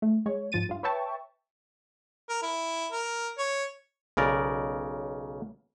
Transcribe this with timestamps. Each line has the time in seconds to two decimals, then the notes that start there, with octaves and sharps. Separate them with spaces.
0.02 A3
0.26 G#3 C#5
0.52 G#2 F3 A6 D#7
0.69 G2 F4
0.83 B4 C#5 E5 G5 A5 C#6
2.29 A#4
2.42 E4
2.92 A#4
3.38 C#5
4.17 B1 C#3 A#4 D5